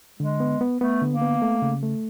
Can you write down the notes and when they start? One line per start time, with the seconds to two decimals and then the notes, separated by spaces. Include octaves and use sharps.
0.19 D3 G#3
0.40 B3
0.61 B3
0.81 A3 B3
1.02 D3
1.11 A#3
1.21 B3
1.42 A3
1.62 C#3
1.83 A3